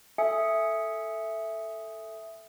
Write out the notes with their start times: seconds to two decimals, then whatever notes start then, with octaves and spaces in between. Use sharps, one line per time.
0.18 A4 E5 G#5 D#6 C#7